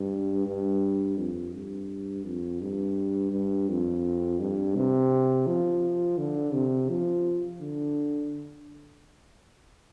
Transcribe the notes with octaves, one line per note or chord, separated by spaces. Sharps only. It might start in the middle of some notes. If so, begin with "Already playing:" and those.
Already playing: G2
G2
F2
G2
F2
G2
G2
F2
G2
C3
F3
D3
C3
F3
D3